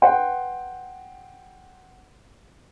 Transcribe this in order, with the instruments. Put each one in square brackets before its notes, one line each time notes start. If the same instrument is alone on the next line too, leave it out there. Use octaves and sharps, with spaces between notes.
[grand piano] B4 F#5 G5 C6